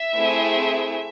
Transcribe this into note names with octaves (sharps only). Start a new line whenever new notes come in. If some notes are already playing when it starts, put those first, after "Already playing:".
Already playing: E5
A3 C4 E4 G#4